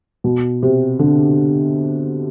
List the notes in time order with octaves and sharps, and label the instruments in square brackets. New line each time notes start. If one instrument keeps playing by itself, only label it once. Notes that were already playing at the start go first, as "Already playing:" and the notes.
[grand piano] B2
C3
D3